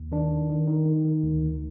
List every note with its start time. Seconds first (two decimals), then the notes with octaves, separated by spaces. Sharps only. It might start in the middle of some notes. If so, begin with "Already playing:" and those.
Already playing: D#2
0.12 D#3 D4
0.31 D#3
0.50 D#3
0.67 D#3 D#4
0.86 D#3
1.05 D#3
1.23 D2
1.42 D2